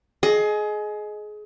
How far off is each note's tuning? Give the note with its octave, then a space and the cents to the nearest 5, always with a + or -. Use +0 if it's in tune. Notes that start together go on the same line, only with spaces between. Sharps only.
G#4 +25 D#5 +0